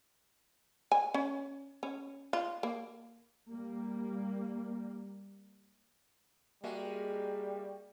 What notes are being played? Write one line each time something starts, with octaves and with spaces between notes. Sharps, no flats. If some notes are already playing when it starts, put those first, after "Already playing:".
G#5
C#4
C#4
F4
A#3
G3 A#3
G3 G#3 A#3 F#4 E5